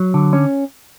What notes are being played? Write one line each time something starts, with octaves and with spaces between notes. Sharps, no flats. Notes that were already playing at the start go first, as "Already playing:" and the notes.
Already playing: F#3
D3
C#4